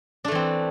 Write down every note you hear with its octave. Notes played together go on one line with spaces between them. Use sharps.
E3 A3 C4 D4